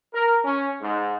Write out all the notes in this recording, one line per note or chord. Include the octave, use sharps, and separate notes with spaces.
A#4
C#4
G#2